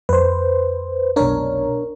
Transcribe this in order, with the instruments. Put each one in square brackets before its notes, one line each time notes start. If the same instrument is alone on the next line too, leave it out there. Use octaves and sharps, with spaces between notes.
[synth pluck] F2 [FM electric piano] B4 C5
[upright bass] F1 B1 [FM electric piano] D4 A#4 C#5